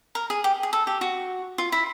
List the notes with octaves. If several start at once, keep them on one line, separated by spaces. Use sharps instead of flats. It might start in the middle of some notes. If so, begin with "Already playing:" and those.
A#4
G#4
G4
G#4
A4
G4
F#4
F4
E4